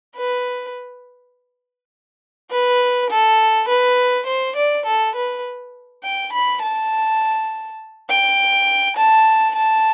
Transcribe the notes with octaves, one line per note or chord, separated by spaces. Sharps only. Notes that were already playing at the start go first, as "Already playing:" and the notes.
B4
B4
A4
B4
C5
D5
A4
B4
G5
B5
A5
G5
A5
A5